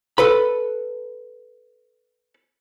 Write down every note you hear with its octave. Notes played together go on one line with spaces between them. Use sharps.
A4 B4 B5